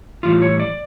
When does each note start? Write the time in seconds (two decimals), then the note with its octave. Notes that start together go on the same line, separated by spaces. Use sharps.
0.23 A2 E3 G3 F4
0.42 C#5
0.60 D5